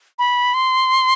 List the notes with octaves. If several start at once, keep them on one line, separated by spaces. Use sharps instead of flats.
B5
C6